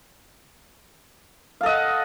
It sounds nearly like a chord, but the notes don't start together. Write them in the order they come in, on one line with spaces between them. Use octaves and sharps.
F5 A4 D#5 F#5